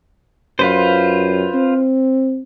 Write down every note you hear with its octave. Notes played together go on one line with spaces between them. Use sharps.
F#2 F4 B4 C5
C4